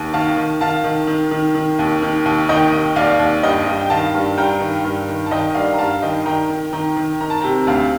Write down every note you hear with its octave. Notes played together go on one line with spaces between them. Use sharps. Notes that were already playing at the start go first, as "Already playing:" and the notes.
Already playing: D#2
D#3 F5 A5
D#3
D#3 F5 A5
D#3
D#3
D#3
D#3
D#2
D#3
D#2
D#3 D#5 G5
D#2
D#2 D5 F5
D#2
G2 D#5 G5
G2
G5
D#3 F5 A5
G2
G2 G5 A#5
D#3
G2
D#3
A5
D#3 D#5 G5
G2 D5 F5
A#5
G2 F5 A5
D#3 D#5 G5
D#3 G5 A#5
D#3
D#3 G5 A#5
D#3
D#3 A#5
A5
C3 G5 A#5
D2 F5 A5